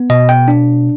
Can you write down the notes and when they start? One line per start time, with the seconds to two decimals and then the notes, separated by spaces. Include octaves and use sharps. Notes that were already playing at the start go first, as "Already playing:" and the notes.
Already playing: B3
0.10 B2 D#5
0.29 G5
0.48 D4